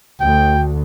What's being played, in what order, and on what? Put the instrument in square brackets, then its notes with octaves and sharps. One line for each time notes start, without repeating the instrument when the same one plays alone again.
[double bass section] D2 [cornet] G5